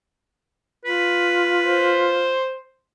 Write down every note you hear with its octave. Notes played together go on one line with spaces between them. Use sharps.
F4 B4
C5